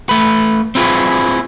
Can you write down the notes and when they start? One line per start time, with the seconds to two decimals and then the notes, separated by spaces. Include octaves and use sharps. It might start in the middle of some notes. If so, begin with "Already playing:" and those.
0.09 A3 B4
0.75 C4 E4 F4 G#4 B4